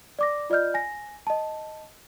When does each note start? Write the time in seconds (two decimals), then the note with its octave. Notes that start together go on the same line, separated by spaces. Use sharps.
0.19 D5 D6 A#6
0.50 F4 D5 D#5 F6 G6
0.74 G#5 A#6
1.27 D#5 A5